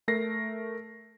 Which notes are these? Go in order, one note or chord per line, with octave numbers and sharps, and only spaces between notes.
A3 A#4 A#6 C7